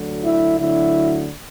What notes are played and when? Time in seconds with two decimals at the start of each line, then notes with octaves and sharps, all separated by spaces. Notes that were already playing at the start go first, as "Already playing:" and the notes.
Already playing: D2 D3 F#3
0.23 E4
0.58 D2 D3 F#3 E4